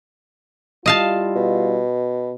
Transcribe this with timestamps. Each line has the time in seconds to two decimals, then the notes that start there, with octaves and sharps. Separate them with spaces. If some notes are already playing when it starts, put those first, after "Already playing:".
0.86 G3 E4 F4 D#5 F5 A5
1.35 B2